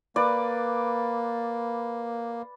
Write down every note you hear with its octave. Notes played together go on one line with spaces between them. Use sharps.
A#3 B4 D5